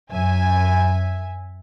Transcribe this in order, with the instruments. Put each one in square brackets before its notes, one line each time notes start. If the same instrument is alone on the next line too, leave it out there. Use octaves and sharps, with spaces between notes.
[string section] F#2 E5 G#5